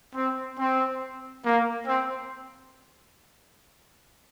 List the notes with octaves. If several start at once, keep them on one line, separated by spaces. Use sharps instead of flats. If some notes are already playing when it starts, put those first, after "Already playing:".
C4
C4
A#3
C4